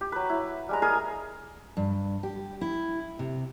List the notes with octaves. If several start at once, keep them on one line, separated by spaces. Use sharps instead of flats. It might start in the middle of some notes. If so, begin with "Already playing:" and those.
G4
F#3 B4
E4
G3 G#3 A#5
G#4 A#4 D#6
G2
G4
E4
C3